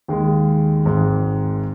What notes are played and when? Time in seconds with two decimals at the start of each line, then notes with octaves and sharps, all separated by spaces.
0.08 D#2 D#3 G#3
0.85 G#1 G#2 D#3 G#3